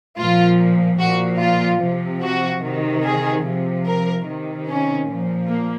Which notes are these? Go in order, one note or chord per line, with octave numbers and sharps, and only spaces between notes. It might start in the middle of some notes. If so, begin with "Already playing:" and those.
A#2 F3 F4
A#2 F3 F#4
F4
C3 F3
F#4
C3 D#3
G#4
C3 F3
A#4
C3 D#3
C#4
A#2 F3
A#3